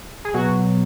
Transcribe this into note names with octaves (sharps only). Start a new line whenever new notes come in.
G#4
B2 F#3 F#4